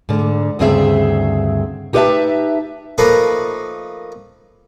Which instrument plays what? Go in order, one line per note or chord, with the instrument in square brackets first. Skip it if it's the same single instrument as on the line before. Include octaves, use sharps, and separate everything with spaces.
[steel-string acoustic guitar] G#2 D3
D2 G2 C#3 C4 G#4 E5
D#4 G4 B4 C5 E5 A5
[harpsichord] F3 A3 A#3 D#4 F4 B4